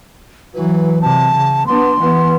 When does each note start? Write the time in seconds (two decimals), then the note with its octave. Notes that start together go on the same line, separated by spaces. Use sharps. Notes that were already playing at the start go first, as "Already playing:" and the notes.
0.54 E3 F#3 B4
1.02 C3 A5
1.34 C#3
1.67 B3 D4 C6
2.00 E3 B3